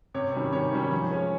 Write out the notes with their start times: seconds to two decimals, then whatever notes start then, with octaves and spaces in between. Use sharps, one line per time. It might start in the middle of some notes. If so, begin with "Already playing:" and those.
0.14 C3 C#5
0.34 D#3 G3 C#4
0.53 C3 C#5
0.73 D#3 G3 C#4
0.91 F3
1.11 G#3 C#4